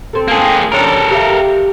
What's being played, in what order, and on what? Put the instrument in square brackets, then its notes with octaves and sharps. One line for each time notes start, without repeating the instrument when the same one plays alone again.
[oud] C4 A4
[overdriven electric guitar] A#3 G#4
[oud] C#3 F3 D4 [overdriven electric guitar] A4 A#4
[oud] G4 E5 F5